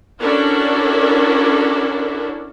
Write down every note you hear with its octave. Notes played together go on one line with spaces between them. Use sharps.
C#4 D4 E4 F#4 A4 A#4